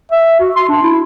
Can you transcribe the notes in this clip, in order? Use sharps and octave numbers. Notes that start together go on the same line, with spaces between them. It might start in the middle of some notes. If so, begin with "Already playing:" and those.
E5
F#4
C6
D4
E4